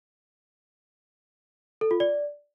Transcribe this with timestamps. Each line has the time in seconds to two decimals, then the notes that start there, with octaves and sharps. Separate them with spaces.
1.81 A4
1.91 F4
2.00 D5